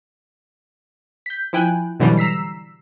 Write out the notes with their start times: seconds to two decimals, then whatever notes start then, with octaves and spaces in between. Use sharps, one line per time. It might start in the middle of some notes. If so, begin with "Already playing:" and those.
1.26 G6 B6
1.53 F3 E4 G5 G#5 F#6
2.00 B2 D3 E3 F#3 G3
2.17 A#5 E6 B6 C7